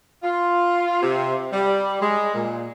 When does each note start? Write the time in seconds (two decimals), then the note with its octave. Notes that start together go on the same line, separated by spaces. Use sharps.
0.23 F4
1.02 C3
1.53 G3
2.01 G#3
2.34 A#2